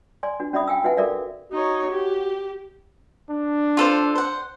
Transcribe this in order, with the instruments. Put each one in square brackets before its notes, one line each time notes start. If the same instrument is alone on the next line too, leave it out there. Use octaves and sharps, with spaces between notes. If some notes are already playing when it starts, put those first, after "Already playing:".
[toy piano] D5 G#5 C6
D4 F#4
C#4 F#4 D5 E5 B5 D#6
F5 G5 G#5 E6
D#4 F#4 B4 E5 F#5 G#5
F#4 A4 A#4 D5 E5 F5
[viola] D#4 C#5 [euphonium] F#4
[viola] G4
[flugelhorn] D4
[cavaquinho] F4 A4 C5
C5 F#5